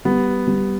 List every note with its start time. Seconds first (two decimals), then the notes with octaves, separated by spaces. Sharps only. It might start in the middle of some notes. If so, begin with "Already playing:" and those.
0.05 G3 B3
0.47 G3